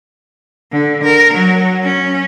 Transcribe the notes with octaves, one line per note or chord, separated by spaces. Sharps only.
D3
A#4
F#3
C#4